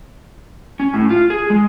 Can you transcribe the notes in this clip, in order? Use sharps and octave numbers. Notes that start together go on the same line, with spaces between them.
C#4
A2
F4
G#4
G#3